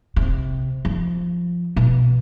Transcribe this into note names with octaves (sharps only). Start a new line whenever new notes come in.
C3
F3
B2